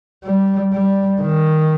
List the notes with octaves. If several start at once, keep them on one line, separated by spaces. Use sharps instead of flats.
G3
G3
D#3